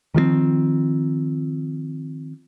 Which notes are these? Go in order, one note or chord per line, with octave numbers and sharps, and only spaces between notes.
D#3 F3 G3 C4